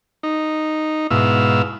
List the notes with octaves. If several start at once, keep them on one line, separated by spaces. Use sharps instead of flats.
D#4
G#2 B2 E4 F5 E6